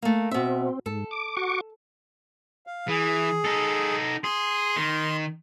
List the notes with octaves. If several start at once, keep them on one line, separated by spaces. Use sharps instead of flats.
A3 A#3
B2 C4 E5
G#2 A4
D6
F#4 C#6 D6
F5
E3 G#4
D#4 A4
G#4 C6
D#3